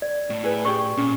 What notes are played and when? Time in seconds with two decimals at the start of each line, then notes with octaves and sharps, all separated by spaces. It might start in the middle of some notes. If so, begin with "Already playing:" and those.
0.02 D5
0.30 A2
0.43 E4 G#4 B4
0.65 G4 G#4 D5 C#6
0.97 A#2 C#4